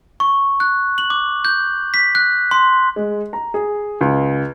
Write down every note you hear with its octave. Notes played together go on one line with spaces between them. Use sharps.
C#6
F#6
F#7
D6
G6
B6
F#6
C6
G#3
A#5
G#4
C#2